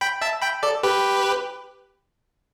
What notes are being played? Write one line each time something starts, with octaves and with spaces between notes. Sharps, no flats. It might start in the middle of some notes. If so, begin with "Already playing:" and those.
G5 B5
E5 A5
G5 B5
A4 D5
G4 B4